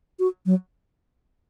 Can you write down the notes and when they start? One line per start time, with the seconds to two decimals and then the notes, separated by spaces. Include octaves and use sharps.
0.19 F#4
0.46 F#3